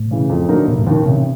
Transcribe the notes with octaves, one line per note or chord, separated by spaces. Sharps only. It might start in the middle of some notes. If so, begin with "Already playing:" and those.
Already playing: A2
C#3 E3
F2
D3 F#3 A#3 D#4
F1 A#2
A2
D#2 A#2 D#3
A1 C3